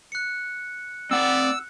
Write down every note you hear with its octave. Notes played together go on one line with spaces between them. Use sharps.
F#6 C#7
C4 D5 F#5 E6